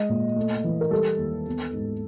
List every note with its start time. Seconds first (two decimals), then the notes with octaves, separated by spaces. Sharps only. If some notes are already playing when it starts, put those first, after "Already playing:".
Already playing: G#3 D#5
0.09 A#2
0.36 A3
0.64 E3
0.81 A#4
0.91 G3 A4
1.18 D#2
1.46 B3
1.74 G#2